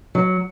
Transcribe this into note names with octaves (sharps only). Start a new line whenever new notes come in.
F#3